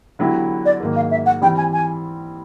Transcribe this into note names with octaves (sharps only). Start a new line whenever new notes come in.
D3 F#3 B3 E4 G4
D5
G#2 D#3 F#3 A#3
F5
E5
F#5
E3 G3 C4 G5
G#5
G#5